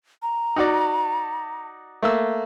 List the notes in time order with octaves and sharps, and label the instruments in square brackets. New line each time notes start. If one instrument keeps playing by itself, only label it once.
[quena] A#5
[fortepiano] D#4 F#4 D5
A3 A#3 E6